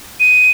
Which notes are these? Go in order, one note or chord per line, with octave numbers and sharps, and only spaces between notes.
D#7